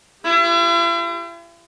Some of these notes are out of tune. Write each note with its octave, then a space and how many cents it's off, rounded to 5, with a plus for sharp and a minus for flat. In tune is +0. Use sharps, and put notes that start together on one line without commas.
E4 +45 G4 +0